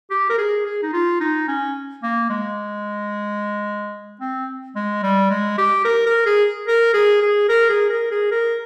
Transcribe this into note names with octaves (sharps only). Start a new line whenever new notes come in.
G4
A#4
G#4
G#4
D#4
F4
D#4
C#4
A#3
G#3
C4
G#3
G3
G#3
G4
A#4
A#4
G#4
A#4
G#4
G#4
A#4
G#4
A#4
G#4
A#4